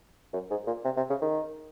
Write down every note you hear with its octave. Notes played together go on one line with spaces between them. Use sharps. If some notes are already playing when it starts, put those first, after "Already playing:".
F#2
G#2
A#2
C3
C3
C#3
D#3